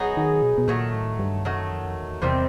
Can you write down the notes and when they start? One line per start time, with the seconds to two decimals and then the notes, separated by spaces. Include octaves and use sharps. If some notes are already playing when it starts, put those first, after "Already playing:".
Already playing: F#3 B3 D#4 G#4
0.17 D#3
0.42 B2
0.58 B2
0.68 A#2 D#3 F#3 A3
0.94 A2
1.19 G2
1.45 F#2 D#3 F#3 A3
1.71 F2
1.79 F#2
1.87 F2
1.96 E2
2.22 E2 C3 D#3 G3 C4